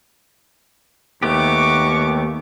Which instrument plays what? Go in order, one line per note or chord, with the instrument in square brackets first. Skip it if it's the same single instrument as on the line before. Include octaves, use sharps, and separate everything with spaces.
[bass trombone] D#2 [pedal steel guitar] A3 B3 G4 [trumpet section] F#4 C#6 [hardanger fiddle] D6